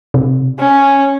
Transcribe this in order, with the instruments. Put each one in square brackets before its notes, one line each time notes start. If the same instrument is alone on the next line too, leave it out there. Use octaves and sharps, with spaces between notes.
[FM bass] C3
[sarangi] C#4